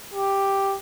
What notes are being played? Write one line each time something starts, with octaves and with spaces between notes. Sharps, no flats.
G4